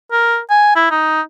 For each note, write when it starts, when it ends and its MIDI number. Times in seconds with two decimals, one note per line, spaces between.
0.12 0.38 70
0.50 0.75 80
0.76 0.86 64
0.91 1.21 63